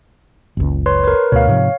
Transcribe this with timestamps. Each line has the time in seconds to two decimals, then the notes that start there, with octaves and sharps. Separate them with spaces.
0.57 F#1 C#2
0.86 B4 C#5 C6
1.04 A#4 B4
1.32 D2 B2 C#5 F5
1.47 G#2 C3 F3